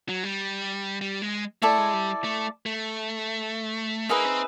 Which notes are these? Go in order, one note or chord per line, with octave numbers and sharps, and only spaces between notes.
F#3
G3
G3
G#3
A3 E4 A4 D5
G#3
G3
A3
A3
A#3 D#4 G#4 B4 E5
C4